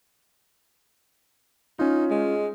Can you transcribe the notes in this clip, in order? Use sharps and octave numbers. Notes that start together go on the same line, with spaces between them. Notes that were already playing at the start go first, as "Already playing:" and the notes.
C#4 D#4 F4
G#3